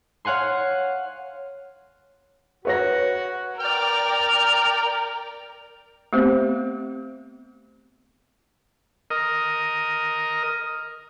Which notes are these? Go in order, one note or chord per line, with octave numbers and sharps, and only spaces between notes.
C#5 F5 F#5 G#5 C6
F#4 B4 C#5 A#6
A#4 D5 G5 F6
A3 B3 C4 G4 C5
A#4 D#5